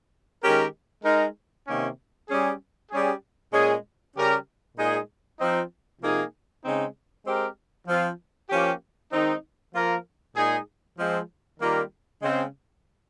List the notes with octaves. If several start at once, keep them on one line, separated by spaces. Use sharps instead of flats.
D#3 G#3 C#4 G4 A#4
G#3 D#4 A#4
C3 D#3 A#3 C#4
G3 C#4 G#4
G3 C#4 G#4
A#2 G#3 C#4 G#4
C#3 G3 C#4 G4 A#4
A#2 G#3 D#4 G#4
F3 C4 D#4
C3 F3 A#3 D#4 G#4
C#3 G#3 C4 D#4
G#3 C4 G4 A#4
F3 C4 F4
F3 A#3 C#4 G4
D#3 G#3 C4 D#4
F3 A#3 F4 A#4
A#2 G#3 D#4 G#4
F3 G#3 C4
D#3 G3 A#3 F4 A#4
C#3 G#3 C4